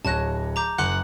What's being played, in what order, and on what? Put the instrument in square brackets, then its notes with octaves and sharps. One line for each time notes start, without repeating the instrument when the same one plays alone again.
[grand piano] D1 C#5 A#6 [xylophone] A5 F#6
[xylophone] A#5 D6 G6
[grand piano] F#1 [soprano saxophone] F#5 [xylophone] C6 D6 F#6